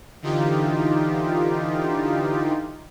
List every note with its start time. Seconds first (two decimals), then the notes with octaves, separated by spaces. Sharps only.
0.22 D3 E3 D#4 F4 G4